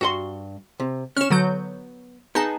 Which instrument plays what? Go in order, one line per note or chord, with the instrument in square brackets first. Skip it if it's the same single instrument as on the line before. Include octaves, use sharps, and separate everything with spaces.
[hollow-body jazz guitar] G2 A4 C6 [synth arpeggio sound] F#4
[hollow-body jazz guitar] C3
[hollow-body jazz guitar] C#4 C#5 [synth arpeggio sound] F6 E7
[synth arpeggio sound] D3 F#3 G6 [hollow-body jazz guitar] B3
[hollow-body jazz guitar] B3 G#4 [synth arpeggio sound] D#4 A5